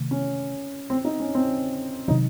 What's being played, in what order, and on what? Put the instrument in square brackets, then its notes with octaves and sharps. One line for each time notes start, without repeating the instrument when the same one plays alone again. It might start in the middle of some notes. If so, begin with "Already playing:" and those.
Already playing: [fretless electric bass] C3 D#3 A3
[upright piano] C#4
C4
D#4
C#4
C4
[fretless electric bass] C3 D#3 F#3 [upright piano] D#4